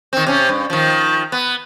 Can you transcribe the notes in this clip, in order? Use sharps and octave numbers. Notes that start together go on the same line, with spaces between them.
D#3 C4
C3 C#4
G2
D#3 F3
B3